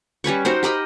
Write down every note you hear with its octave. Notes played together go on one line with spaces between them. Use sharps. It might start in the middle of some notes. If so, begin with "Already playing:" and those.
G3 C#4 B4 C#6
D#4 F#4 A#4 C5
G4 A#4 D#5 B5